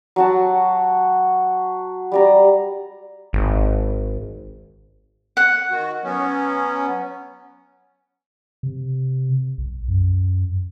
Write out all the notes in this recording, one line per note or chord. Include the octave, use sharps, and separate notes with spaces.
F#3 F#4 A5
G3 D5 A#5
G#1
F#5
D#3 F#4
F#3 B3 C#4
C3
B1
F#2